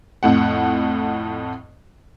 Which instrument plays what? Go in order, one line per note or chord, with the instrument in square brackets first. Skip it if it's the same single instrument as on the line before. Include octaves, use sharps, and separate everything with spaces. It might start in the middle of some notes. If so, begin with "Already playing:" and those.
[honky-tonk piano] F2 A2 F#5